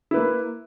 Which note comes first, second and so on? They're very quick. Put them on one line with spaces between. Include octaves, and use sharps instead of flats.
E4 B4 A#3